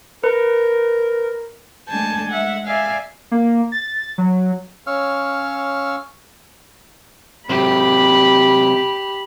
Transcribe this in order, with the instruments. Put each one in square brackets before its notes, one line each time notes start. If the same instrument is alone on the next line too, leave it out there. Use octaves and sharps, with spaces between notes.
[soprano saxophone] A#4 [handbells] B4
[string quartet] G#3 A3 D4 G#5 A5 G6
G#3 E5 F#5
D5 E5 F5 G#5
[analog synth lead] A#3
A6
F#3
[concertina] C#4 C#5 F5 C#6 E6 F6
[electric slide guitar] C3 F#3 C4 [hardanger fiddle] G4 [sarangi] B5